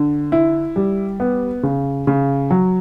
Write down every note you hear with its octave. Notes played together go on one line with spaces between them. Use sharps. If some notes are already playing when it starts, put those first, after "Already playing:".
Already playing: D3
E4
G3
B3
C#3
C#3
F#3